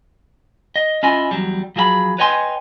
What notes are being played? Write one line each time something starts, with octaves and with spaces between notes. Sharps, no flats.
D#5
C#4 E4 F4 D#5 G#5
E2 F#3 G3
F3 F#3 G#4 E5 B5
B4 C#5 D#5 G5 G#5 C6